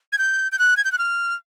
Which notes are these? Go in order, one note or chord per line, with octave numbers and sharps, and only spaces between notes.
G#6
G6
G6
F#6
G#6
G6
F#6
F6